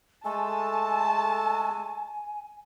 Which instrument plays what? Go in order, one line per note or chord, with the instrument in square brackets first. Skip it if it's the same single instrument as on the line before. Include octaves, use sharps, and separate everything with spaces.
[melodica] G#3 A3 A4 [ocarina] G#5 [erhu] A5